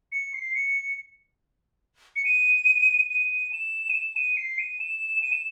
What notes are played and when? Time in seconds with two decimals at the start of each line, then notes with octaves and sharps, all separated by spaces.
0.12 C#7
0.34 C7
0.55 C#7
2.16 C#7
2.25 D#7
3.10 D#7
3.53 E7
3.90 D#7
3.95 E7
4.16 D#7
4.37 C7
4.59 D#7
4.80 E7
5.22 D#7
5.32 E7